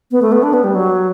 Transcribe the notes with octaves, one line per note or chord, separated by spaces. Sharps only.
B3
A3
B3
D4
B3
G3
F#3